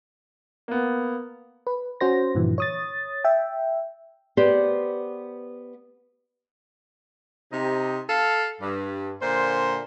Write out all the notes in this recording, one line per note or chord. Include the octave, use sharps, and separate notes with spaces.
A#3 B3
B4
C#4 F#4 C5 A#6
G2 A#2 D3 E3 F3
C#5 D#6 A6
E5 G5
B3 G4 C5 D5
C3 D#4
A4 F5
G2
A#2 D3 C5